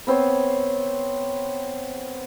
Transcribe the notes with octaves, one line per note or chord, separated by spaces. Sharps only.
B3 C4 C#5